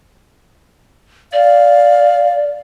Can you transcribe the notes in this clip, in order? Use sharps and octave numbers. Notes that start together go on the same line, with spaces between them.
D5 F5